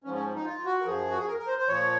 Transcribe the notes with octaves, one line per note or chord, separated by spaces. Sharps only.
G#2 F3 C#4
C#4
D#4
F4
F#4
A#4
F#2 F3 G#4
F#4
G#4
A#4
A#4
C5
C5
A#2 F3 C#5